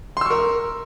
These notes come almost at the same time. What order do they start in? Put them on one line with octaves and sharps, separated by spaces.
C6 E6 C#6 A#4